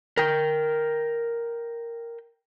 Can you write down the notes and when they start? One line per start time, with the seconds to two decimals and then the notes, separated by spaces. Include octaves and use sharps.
0.17 A#4 G5